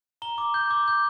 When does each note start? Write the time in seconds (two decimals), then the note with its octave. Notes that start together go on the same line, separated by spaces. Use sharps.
0.22 A#5 G7
0.38 D6
0.54 G6
0.71 D6
0.88 G6